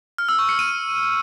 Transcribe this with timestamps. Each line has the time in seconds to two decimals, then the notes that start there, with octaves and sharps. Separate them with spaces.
0.18 F6
0.29 E6
0.39 C#6
0.49 C#7
0.59 D#7